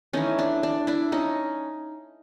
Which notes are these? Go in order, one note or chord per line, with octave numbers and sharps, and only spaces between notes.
E3 A3 C#4 D#4
D4
D4
D4 E4
C#4 D#4